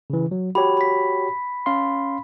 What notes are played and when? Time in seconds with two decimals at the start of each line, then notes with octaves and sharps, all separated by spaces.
0.10 C#3 E3
0.31 F#3
0.55 F#4 G4 C#5 B5
0.77 B5 B6
1.66 C#4 F5 C6